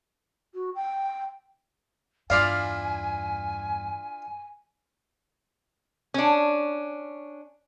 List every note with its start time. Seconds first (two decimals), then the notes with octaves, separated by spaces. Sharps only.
0.54 F#4
0.75 G5
2.30 E2 G2 D4 E4 F4 D5 F5 G#5
6.14 C#4 D4